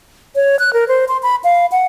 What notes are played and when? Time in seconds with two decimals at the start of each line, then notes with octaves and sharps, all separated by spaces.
0.35 C#5
0.59 F#6
0.73 A#4
0.88 C5
1.08 C6
1.23 B5
1.44 F5
1.72 F#5